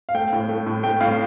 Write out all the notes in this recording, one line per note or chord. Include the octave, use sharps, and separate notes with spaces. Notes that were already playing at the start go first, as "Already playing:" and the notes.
F5
A3 G5
A2
A3
A2
A3 G5
A2 F5